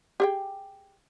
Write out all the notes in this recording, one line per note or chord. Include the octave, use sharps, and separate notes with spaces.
G4 G#4 G5